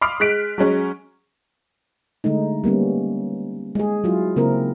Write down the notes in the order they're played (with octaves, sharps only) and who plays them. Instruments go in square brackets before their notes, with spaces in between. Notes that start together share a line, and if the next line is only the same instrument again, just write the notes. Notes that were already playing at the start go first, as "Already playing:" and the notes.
[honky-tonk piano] B5 C6 D6 D#6 F6 C7
G#3 F#6 B6 D7
F#3 G#3 C#4
[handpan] D3 G#3 A3 D#4
G3 A#3 B3 C#4
G#3 G#4
F#3 E4 F4
C#3 A#3 C4 E4 A#4